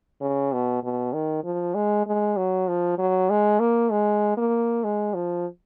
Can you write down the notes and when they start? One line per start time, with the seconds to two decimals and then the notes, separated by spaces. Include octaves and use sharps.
0.21 C#3
0.53 B2
0.83 B2
1.13 D#3
1.44 F3
1.75 G#3
2.07 G#3
2.36 F#3
2.68 F3
2.98 F#3
3.30 G#3
3.60 A#3
3.91 G#3
4.37 A#3
4.84 G#3
5.14 F3